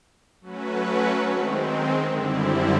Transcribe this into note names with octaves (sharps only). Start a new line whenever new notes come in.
F#3 A3 C#4 F#4 B4
D#3 G#3 C4
F#2 D3 G3 C4 E4